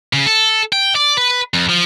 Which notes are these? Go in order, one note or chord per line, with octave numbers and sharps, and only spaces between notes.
C#3
A4
G5
D5
B4
F2
F3